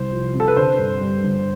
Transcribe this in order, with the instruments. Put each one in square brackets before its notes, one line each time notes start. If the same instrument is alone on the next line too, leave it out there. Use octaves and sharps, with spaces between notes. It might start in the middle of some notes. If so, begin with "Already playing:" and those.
Already playing: [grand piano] C2 [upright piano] C5
[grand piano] F3
C3
[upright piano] A4
B4
[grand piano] D3 [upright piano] C5
[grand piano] G2
G3
G1